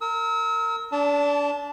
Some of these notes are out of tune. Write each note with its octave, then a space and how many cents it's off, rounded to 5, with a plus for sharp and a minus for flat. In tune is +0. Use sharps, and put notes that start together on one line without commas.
A#4 -25 E6 -40
D4 -30 A5 +0